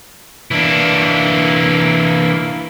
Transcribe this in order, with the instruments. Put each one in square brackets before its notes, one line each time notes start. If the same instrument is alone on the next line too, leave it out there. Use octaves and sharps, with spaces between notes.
[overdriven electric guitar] E3 D4 [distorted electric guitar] A#3 E4